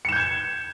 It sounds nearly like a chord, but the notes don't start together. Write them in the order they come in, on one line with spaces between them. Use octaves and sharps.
C#7 E7 G6 G#6